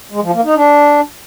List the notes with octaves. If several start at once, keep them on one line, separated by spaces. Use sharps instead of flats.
G#3
F3
A#3
D#4
D4